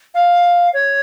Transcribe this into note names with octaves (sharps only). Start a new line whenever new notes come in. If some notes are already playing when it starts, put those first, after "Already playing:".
F5
C#5